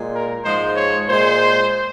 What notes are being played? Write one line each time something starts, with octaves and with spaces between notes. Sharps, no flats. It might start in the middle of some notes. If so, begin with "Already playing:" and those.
Already playing: A#2 G#3
A#4
G#2 F3 G#3 C5
C#5
A#2 G#3 C5